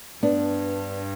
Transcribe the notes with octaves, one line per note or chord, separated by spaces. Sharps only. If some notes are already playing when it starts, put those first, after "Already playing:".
G2 B3 D4